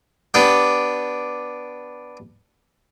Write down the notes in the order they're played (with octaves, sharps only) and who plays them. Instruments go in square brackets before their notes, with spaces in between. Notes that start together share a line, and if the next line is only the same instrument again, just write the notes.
[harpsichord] B3 D4 G4